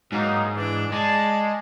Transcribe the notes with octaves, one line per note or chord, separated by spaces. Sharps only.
G#2 F#3 A#3 D#4
E3 D4
G#3 D5 A5